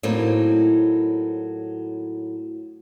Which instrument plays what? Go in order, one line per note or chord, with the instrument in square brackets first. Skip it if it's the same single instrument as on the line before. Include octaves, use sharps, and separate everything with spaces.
[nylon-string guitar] A2 F#3 A#3 C4 D#4